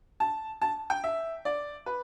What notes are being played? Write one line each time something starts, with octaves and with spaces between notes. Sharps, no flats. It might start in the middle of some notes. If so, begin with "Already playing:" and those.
A5
A5
G5
E5
D5
B4